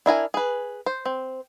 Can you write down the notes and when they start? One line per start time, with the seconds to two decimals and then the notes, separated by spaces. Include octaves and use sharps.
0.06 D4 E4 A#4 G#5
0.34 G#4 B4
0.86 C5
1.05 C4